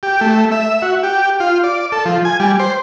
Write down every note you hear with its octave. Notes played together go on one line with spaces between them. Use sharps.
G4
A3
E5
F#4
G4
F4
D5
A4
F3
G#5
G3
C5